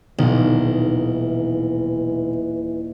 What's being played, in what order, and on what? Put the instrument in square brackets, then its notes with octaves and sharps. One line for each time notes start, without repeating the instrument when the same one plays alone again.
[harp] D#1 D#3 [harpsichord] B1 [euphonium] E3